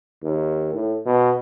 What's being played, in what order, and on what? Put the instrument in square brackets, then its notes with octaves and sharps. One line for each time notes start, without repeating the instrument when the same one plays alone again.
[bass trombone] D#2
A2
B2